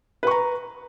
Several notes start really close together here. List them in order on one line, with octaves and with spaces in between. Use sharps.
B4 C#6 A#5